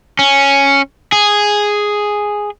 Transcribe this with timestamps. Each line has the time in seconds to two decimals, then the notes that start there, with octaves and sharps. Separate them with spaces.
0.19 C#4
1.12 G#4